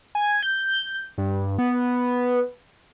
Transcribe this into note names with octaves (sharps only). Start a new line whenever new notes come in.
G#5
G6
G2
B3